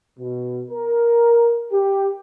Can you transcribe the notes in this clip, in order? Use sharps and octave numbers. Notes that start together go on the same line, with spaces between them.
B2
A#4
G4